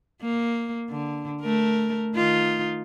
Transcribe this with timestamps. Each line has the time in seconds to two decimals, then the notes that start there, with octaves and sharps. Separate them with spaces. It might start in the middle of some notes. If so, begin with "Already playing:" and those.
0.22 A#3
0.90 D3
1.42 A3 A#4
2.16 D#3 D#4 F4